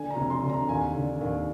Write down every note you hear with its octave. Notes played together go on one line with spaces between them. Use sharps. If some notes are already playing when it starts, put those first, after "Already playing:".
Already playing: D3 G#5
A#5
F1
C6
D3
A#5
D#2 G#5
D3
D#2